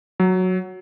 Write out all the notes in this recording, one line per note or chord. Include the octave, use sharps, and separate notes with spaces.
F#3